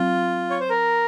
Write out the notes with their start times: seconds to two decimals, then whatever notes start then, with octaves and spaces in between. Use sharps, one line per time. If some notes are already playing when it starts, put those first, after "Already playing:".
Already playing: F#3 C4 F4
0.50 C#5
0.60 C5
0.70 A#4